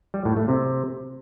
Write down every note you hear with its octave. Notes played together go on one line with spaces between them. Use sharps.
G3
A2
A3
C3